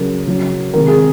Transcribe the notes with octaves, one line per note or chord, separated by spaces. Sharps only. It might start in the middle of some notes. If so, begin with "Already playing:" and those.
Already playing: C#3 F#3 C#4 A#4
C#3 F#3 C#4
C3 D#3 G#3 C4 A#4
G#4